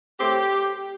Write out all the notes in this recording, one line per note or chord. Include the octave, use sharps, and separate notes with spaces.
A2 A3 C4 G4